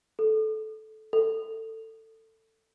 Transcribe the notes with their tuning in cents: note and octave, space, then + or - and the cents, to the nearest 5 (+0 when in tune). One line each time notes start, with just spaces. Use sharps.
A4 -15
A4 +20